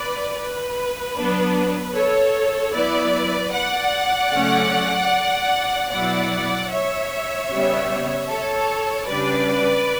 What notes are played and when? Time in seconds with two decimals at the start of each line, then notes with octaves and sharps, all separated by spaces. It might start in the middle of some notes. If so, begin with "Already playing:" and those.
Already playing: B4 D5
0.37 B4
1.16 F#3 B3 D4
1.94 A4 C#5
2.74 F#3 B3 E4 B4 D5
3.53 D5 F#5
4.32 C#3 F#3 A3 C#4
5.91 B2 F#3 B3 E4 D5 F#5
6.71 C#5 E5
7.49 C#3 G3 B3
8.28 A4 C#5
9.08 C#3 G3 D4 B4 D5